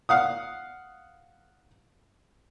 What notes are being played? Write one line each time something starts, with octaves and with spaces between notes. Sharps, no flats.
F5 F#5 D#6